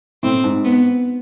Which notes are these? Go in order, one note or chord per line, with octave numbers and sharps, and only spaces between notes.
A2 C4
G#2
B3